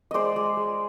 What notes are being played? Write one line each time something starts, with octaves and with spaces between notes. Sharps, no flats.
G#3 C5 D5 D#5
G#3
G#3